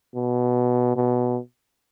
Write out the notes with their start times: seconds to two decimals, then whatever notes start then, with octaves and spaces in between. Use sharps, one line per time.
0.15 B2
0.96 B2